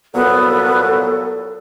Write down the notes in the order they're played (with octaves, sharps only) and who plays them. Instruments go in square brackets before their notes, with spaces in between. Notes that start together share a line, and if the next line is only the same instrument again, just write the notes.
[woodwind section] C2 A#2 F#3 [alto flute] B3 [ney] A4